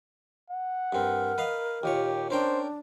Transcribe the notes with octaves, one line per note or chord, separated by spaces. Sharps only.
F#5
G2 C4 A#4
B4 D#5 F5
D#2 A#2 G4 C#5
C#4 D4 A#4 C5 G5